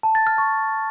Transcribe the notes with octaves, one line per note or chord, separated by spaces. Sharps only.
A5
A6
F6
C#6